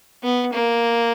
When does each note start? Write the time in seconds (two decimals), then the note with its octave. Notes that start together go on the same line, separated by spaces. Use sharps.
0.23 B3
0.53 A#3